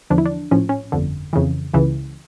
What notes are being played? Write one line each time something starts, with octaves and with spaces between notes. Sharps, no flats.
E2 D3 F3 D4
E4
D4
A#1 A2 F3 C#4
C#4
G1 F2 D3
F2 C#3 E3
C#2 C#3 E3